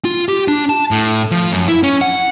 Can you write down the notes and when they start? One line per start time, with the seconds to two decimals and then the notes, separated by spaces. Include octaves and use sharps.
0.05 F4
0.29 G4
0.48 D4
0.69 A5
0.91 A2
1.31 F3
1.52 F#2
1.68 E4
1.83 C#4
2.01 F#5